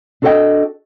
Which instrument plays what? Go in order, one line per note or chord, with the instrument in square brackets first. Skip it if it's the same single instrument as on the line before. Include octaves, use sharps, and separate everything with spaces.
[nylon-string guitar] D4 F#4 A4 C#5 D#5 G5